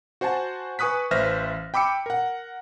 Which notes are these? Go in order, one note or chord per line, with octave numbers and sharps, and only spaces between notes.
F#4 C5 F#5 G#5 A5
B4 G#5 C#6 D#6 F#6 B6
A1 B4 C5 E5 F6 A#6
G5 B5 D6 E6 C#7
A#4 F#5